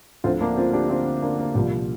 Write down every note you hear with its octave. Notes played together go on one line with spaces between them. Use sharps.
D2 D3 F3 C4 F4
A#3 D4
C4 F4
D4 G4
C4 F4
A#3 D4
A#3
C2 A#2 F3 G3